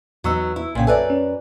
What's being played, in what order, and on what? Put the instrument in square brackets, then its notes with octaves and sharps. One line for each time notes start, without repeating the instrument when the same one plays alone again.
[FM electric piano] E2 C#6 E6 [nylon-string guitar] F#3 B3 D#4
[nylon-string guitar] E4
[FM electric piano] B1 G5 [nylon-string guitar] A#2 C#3
[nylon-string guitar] F#2 B4 D5 [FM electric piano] A4 E5 G#5
[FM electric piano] C#4